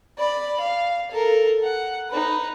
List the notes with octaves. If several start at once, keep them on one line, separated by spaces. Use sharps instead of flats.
D5 B5
F5
A4 A#4
F#5
D#4 B4